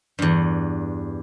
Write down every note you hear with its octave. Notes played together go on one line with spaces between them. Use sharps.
E2 G2